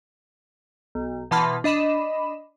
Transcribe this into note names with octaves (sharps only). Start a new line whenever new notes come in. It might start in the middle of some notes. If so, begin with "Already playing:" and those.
B1
B2 E3 A5 B5 C6 F6
D4 D#5 B5 E7